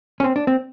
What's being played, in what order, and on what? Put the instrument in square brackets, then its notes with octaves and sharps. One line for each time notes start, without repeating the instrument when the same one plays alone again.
[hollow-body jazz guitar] C#4
C4
D4
C4